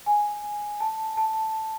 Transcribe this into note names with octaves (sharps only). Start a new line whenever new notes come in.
G#5
A5
A5